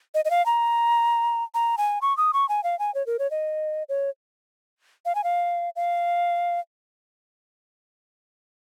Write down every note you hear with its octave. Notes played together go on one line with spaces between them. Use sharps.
D#5
D#5
F5
A#5
A#5
G#5
C#6
D#6
C#6
G#5
F5
G#5
C#5
A#4
C#5
D#5
C#5
F5
G#5
F5
F5